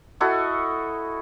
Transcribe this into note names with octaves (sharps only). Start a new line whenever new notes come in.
E4 F#4 A4 D#5